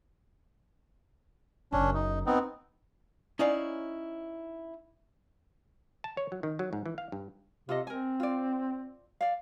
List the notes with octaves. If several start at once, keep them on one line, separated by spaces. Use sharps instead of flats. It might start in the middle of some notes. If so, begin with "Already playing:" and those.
F#1 C#3 C#4 D4
D#4
B3 C4 D#4
C#4 D#4 E4 C#5 D5 F5
A5
C#5
F#3
D#3
F#3
G#2
E3
F5
G2
C3 F4 A4 D#5
C4 A#4 G#5
F4 D5
D5 F5